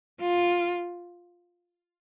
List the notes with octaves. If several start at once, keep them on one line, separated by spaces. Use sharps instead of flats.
F4